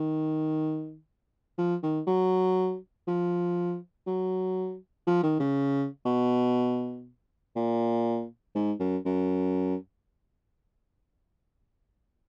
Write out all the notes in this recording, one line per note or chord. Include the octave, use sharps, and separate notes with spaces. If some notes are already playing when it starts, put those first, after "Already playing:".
Already playing: D#3
F3
D#3
F#3
F3
F#3
F3
D#3
C#3
B2
A#2
G#2
F#2
F#2